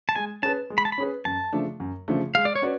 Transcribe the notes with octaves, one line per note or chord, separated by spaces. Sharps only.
A5
G#3 G#5
C#4 G#4 B4 A5
G#3
B5
A5
B5
C#4 G#4 B4
F#2 A5
C#3 F3 A3 D4
F#2
C#3 F3 A3 D4
G#3 F5
D5
C#5
C#4 F#4 B4 D5